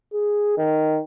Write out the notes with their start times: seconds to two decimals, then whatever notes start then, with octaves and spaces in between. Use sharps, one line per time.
0.13 G#4
0.57 D#3